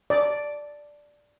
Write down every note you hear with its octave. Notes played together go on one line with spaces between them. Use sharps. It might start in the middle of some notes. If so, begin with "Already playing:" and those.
D5